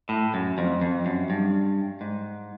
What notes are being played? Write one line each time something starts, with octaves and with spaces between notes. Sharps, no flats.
A2
F#2
F2
F2
F#2
G2
G#2